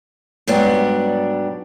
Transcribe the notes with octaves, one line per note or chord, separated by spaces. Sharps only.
G#2 F#3 G3 B3 D4